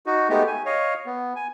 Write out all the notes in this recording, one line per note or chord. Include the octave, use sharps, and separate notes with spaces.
D#4 F#4
G#3 A3 B3 D#4 G4
G#5
C#5 D#5 F5
B3
G#5